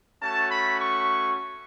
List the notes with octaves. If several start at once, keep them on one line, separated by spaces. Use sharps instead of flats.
A3 C#4 F#4 A5
B5
C#6